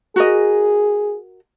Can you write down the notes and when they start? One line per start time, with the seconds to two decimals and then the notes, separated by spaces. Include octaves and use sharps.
0.16 F#4 G#4 A#4 D#5